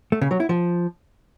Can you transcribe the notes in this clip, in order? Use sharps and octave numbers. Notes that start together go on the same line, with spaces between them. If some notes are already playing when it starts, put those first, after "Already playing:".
A3
C#3
F#3
E4
F3